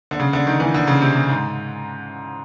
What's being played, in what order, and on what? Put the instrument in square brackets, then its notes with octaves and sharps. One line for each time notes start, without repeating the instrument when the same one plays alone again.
[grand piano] D3
C#3
D3
D#3
E3
D3
C#3
C3
C3
G#2